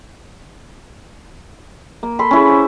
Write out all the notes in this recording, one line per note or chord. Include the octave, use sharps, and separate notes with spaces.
A#3
A4 B5 C6
C#4 E4 G#4
C5